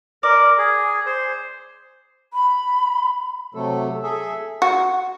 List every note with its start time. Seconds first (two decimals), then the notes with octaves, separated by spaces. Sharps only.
0.23 A#4 D5
0.58 G#4
1.06 C5
2.33 B5
3.55 C3 F#3 A3 A4
4.03 G#4 A4 E5
4.62 F#4